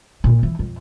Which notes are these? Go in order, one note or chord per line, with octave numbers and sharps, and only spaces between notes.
A#2
E3
F2